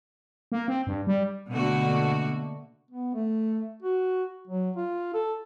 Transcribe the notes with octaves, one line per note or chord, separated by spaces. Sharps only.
A#3
C4
G2
G3
B2 D3 A3 A#3 F#4
B3
A3
F#4
F#3
F4
A4